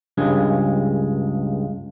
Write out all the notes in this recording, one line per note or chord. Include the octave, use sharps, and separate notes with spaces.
C#2 G2 G#3